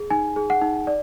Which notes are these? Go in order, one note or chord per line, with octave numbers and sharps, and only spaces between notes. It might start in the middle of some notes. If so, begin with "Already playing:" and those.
Already playing: G#4
D#4 G#5
G#4
F#5
D#4
D5